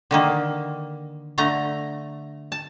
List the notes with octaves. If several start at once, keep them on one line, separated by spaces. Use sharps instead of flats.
D3 D#3 A#3
D3 A3 A#5
A5